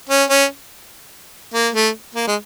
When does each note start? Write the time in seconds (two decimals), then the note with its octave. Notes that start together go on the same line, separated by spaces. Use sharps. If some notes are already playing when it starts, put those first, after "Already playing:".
0.09 C#4
0.30 C#4
1.54 A#3
1.74 A3
2.15 A#3
2.28 G#3